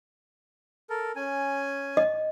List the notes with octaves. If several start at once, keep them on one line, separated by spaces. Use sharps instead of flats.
A4 A#4
C#4 G#5
D#5